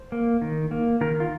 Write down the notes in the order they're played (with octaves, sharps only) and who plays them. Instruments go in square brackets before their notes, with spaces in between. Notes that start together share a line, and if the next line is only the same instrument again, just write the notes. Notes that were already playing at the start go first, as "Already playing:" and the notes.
Already playing: [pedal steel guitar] C5
A#3
D#3
A#3
D#3 A#4
F4